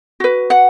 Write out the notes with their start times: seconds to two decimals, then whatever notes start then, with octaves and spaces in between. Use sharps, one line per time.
0.20 F#4 B4
0.50 F#5